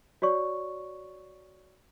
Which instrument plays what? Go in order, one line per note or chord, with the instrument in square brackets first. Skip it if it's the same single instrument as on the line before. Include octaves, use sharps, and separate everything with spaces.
[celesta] F#4 C#5 D5 C#6